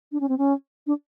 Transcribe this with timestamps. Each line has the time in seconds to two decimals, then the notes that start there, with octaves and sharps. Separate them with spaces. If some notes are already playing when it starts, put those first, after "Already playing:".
0.12 D4
0.20 C#4
0.29 C4
0.38 C#4
0.87 D4